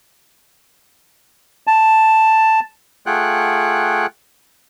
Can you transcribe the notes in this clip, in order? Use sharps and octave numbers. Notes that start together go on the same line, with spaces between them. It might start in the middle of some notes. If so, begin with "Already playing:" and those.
A5
A3 F4 G#4 F#5 G5 F#6